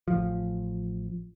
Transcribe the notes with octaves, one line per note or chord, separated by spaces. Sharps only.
A1 F3